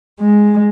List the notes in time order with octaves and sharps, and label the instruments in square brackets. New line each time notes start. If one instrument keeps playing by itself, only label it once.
[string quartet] G#3